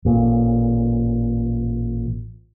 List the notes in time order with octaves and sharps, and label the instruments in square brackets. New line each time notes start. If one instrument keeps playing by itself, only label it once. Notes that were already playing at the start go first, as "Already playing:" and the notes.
[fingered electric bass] A1 A#2